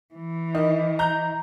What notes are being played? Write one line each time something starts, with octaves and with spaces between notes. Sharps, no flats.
E3
D#3 D#5
A#5 G6